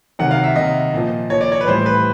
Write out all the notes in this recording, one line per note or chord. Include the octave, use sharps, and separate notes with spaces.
C3 D#3 F#3 F#5
F5
E5
C3 D#3 F#3 D#5
A#2 F3
A#2 F3 C#5
D5
C#5
B4
A2 E3 G3 C5
B4